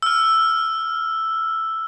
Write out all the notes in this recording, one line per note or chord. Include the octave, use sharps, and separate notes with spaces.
E6 F6